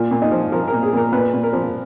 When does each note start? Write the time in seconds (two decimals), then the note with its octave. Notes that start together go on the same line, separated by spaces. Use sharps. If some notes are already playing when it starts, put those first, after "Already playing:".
Already playing: A#2 F4
0.11 A#2
0.22 D#4
0.32 F3
0.52 F3 A#4
0.68 A#2 A#4
0.83 G#4
0.93 A#2 A#4
1.12 A#2 B4
1.34 A#2
1.43 A#4
1.53 F3